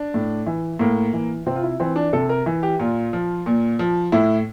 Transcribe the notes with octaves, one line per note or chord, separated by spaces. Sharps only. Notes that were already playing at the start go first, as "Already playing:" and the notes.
Already playing: D4
A2
E3
A2 A#3
E3
C3 C4
F4
E4
E3 C4
D4
C3 A4
A#4
E3
G4
A#2 F4
F3
A#2
F3
A2 E4